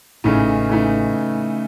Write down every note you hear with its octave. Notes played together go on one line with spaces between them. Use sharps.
A1 A2 C#3 E3 A3 D#4
C#3 E3 A3 D#4